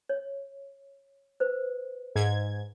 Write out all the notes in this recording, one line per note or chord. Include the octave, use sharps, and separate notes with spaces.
C#5
B4 C5
G#2 G#6